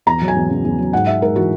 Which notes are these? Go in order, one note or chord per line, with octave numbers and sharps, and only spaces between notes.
E2 A#5
F#3
G#5
E2
C#3
E2
F#3
G#2 F#5
G#3 E5
G#2 A#4
E3 F#4